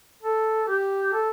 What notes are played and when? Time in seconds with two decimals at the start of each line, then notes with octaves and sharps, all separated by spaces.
0.22 A4
0.68 G4
1.13 A4